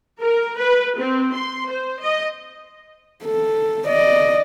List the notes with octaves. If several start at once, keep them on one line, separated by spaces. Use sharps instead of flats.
A#4
B4
C4
C6
C5
D#5
A4
D5 D#5